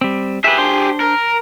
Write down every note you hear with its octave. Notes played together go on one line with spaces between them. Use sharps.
G3 C4
G4 G#4 B4 E5
D4 C5 C6
A#4